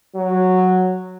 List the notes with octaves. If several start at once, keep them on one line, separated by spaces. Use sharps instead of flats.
F#3